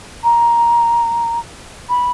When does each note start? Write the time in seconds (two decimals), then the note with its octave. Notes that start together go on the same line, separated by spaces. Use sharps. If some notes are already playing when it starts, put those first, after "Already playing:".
0.24 A#5
1.89 B5